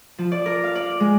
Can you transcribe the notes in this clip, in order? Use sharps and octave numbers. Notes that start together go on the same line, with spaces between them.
F3
D5
A#4
F5
D5
G#3